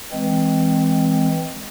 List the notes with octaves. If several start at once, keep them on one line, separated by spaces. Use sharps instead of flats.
E3 G#3 C4